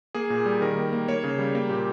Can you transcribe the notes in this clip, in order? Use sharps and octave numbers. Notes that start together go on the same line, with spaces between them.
A#3 G#4
A#2
G3
D#3 A#4
A#3
A#3
A#3 C#5
C#3
G3
A#3
A#2 G4